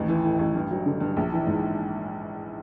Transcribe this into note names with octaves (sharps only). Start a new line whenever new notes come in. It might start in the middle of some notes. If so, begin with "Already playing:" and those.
Already playing: A1 D#2
E3
A2
A1
G2
F#3
D3
G2
A#1
E3
G#2